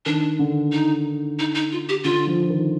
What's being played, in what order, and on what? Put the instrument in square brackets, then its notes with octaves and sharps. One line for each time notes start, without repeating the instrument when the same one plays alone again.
[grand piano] D#3 [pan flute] D4
[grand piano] D3
[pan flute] D#4
D#4
D#4
F4
G4
[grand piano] D3 [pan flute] F4
[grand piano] F3
D#3